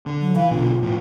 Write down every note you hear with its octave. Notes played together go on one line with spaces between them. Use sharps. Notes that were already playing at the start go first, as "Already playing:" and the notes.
D3
F#3
E3 F5
B1 B2 D3 F4
A2 F3